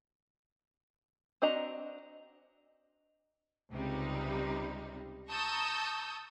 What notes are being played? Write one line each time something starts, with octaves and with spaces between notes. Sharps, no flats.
C4 D4 F#4 D#5 A#5
C#2 C3 G3 D#4
A5 A#5 C#6 D#6 E6 G6